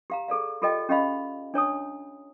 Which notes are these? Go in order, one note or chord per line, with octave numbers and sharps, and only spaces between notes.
G4 F5 A#5
G#4 A4 D5 F5
F4 G4 A4 D5 D#5 G5
C#4 G4 D#5 F5 B5
D4 C#5 A5 D#6